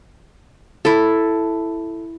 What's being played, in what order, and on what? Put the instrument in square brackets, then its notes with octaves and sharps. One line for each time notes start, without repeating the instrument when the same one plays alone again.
[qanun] E4 A4